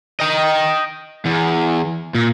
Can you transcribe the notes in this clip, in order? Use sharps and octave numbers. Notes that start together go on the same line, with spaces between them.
D#5 G5
E2
A#2